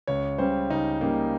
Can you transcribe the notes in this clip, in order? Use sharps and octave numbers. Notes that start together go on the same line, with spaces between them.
C#2 C#5
C#3 G3 C5
C#2 D#4
C#3 G3 A#3